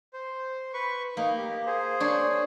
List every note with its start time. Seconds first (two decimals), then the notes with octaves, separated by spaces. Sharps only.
0.13 C5
0.74 B4 C#6
1.17 A#3 D#4
1.37 G4
1.66 G#4 C5
2.00 D4 C#5